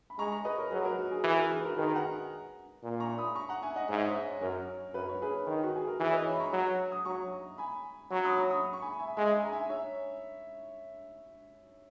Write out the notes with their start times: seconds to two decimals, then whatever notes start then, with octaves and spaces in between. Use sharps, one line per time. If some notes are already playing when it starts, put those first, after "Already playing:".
0.10 B5
0.18 G#3 A#5 C#6
0.32 A#5 C#6
0.45 B4 D#5
0.58 A#4 C#5
0.71 F#3 G#4 B4
0.85 F#4 A#4
0.98 F#4
1.11 G#4
1.24 E3 G#4 B4
1.37 F#4 A#4
1.51 G#4
1.60 B4
1.64 F#4 A#4
1.77 D#3 G#4 B4
1.95 F#5 A#5
2.83 A#2
3.00 A#5 C#6
3.18 B5 D#6
3.35 A#5 C#6
3.49 F#5 A#5
3.62 E5 G#5
3.76 D#5 F#5
3.89 G#2 E5
3.98 D#5
4.08 C#5 E5
4.41 F#2 A#4 C#5
4.94 F#2 B4
5.09 C#5
5.22 G#4 B4
5.47 D#3
5.63 F#4
5.76 G#4
5.87 A#4
6.00 E3 G#4 B4
6.09 C#5
6.13 B4 D#5
6.26 C#5 E5
6.33 B5
6.40 A#5 C#6
6.53 F#3
6.92 D#6
7.05 F#3 A#5 C#6
7.58 G#5 B5
8.11 F#3 A#5 C#6
8.24 B5 D#6
8.37 A#5 C#6
8.50 B5 D#6
8.73 C#6
8.82 G#5 B5
8.99 E5 G#5
9.17 G#3 E5 G#5
9.35 E5 G#5
9.45 A#5
9.52 E5 G#5
9.69 C#5 E5